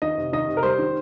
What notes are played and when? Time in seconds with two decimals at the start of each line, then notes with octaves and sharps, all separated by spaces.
0.02 D#3 D#5
0.18 C3
0.33 D#3 D#5
0.48 C3
0.57 A#4
0.63 G3 C5
0.79 D#3